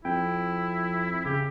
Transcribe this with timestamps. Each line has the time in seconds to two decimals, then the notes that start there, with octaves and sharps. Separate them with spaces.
0.05 F2 E4 G5
1.26 C#3 G4